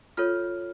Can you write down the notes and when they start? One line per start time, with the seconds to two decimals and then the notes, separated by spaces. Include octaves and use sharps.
0.17 F4 A4 C#5 F6